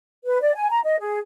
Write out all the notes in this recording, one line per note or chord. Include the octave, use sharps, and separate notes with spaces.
B4
D5
G#5
A#5
D#5
G#4